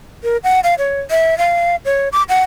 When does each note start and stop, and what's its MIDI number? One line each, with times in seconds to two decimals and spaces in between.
0.23 0.37 70
0.44 0.60 78
0.64 0.75 77
0.78 1.00 73
1.11 1.37 76
1.38 1.76 77
1.85 2.09 73
2.12 2.23 86
2.29 2.42 78